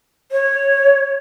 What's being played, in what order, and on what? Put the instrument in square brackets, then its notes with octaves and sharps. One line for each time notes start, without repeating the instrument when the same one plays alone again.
[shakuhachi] C#5